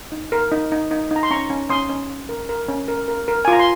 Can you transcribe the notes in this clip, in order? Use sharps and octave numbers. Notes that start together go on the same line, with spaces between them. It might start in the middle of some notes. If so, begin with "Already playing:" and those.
D#4
A#4
D#4
D#4
D#4
D#4
A#5
C6
C#4 A#5 C#6
C#4
C#4 C6 D#6
C#4
C#4
A#4
A#4
C#4
A#4
A#4
A#4
G#5
F4 A#5
C6